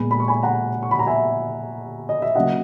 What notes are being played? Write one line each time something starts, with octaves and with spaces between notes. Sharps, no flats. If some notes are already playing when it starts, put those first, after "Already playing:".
Already playing: A#2 G#3 B3 G#5 B5
B5
C#6
G#5 B5
F#5 A#5
C#6
B5
A#5
E5 G#5
D#5
E5
C#3 F#3 A#3 D#5 F#5